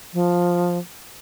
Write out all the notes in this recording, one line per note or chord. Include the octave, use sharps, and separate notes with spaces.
F3